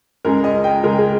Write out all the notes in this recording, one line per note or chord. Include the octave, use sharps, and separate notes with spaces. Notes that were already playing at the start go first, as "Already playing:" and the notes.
C#2 C#3 G#3 A#4
D#5
G5
C#2 C#3 G#3 A#4
G#4